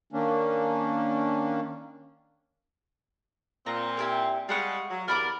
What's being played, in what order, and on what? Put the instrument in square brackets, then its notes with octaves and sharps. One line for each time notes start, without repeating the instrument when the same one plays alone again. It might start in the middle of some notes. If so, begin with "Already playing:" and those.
[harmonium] D#3 A#3 C#4 D4
[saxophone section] A#2 C4 [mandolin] A#5
[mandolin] E4 G4 A#4
[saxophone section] G3 G#3 [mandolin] F5 F#5 C#6
[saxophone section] F#3
[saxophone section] E2 G2 A#4 [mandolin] D5 B5 D6